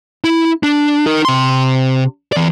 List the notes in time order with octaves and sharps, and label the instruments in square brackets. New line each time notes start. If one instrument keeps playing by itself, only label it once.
[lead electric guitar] E4
D4
D#4 A#4
C3 C6
E3 D5